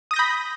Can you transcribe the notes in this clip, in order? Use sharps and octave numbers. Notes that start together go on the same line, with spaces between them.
B5 D#6 G6 A#6